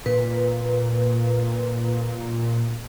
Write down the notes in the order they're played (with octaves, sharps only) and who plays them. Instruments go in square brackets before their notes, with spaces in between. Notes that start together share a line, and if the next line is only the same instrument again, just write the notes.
[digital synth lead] A#2 [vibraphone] B4